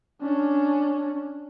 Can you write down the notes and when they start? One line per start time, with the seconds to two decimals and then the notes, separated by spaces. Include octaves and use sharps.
0.21 C#4 D4